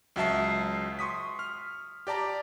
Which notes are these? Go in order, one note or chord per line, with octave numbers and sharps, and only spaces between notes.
C#2 F#3 E5 A5 C7
C6 C#6 D#6 B6
F6
G4 D5 A5 A#5